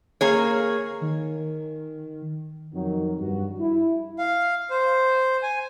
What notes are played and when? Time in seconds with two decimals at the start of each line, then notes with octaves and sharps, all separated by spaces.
0.21 A#3 G#4 C#5
1.01 D#3
2.74 F2 D#3 F#3
3.20 G2 F#4
3.59 E4
4.19 F5
4.70 C5
5.43 G#5